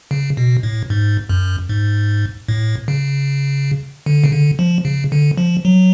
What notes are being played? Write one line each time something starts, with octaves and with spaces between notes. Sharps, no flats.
C#3
B2
A2
G#2
F#2
G#2
A2
C#3
D3
C#3
D3
F3
C#3
D3
F3
F#3